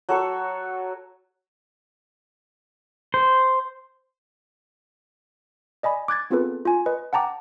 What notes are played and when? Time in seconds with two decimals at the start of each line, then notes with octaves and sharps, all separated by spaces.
0.09 F#3 A4 C#6
3.14 C5
5.83 D5 D#5 G#5 B5
6.08 D6 F#6 G#6 A6
6.30 B3 C4 F4 G#4 A4 B4
6.65 F4 G#5
6.86 B4 D#5
7.13 F#5 G5 A5 A#5 D6